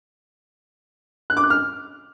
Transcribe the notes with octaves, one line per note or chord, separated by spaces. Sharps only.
F#6
D6
F#6
F6